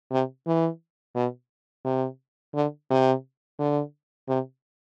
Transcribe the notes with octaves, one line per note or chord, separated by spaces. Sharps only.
C3
E3
B2
C3
D3
C3
D3
C3